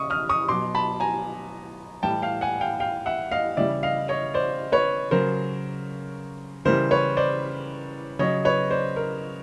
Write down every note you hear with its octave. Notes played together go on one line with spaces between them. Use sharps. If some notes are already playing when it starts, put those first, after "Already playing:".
Already playing: C#3 C#6 D#6
D#6 F6
C#6 D#6
B2 F#3 C6 D6
A5 B5
G#5 A#5
A2 E3 G3 G5 A5
F5 G5
F#5 G#5
F5 G5
F5 G5
E5 F#5
D#5 F5
C#3 E3 G3 D5 E5
D#5 F5
C#5 D#5
C5 D5
B4 C#5
C#3 F#3 A#4 C5
C#3 E3 G3 A#4 C5
B4 C#5
C5 D5
C#3 F#3 C#5 D#5
B4 C#5
C5 D5
A#4